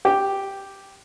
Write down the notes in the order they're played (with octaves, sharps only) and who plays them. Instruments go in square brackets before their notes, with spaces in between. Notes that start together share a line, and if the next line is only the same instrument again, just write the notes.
[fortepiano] G4